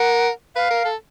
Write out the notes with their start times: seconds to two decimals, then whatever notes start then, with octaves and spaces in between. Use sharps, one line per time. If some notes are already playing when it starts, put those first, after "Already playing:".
Already playing: A#4 F#5
0.56 B4 F5
0.70 A#4
0.85 A4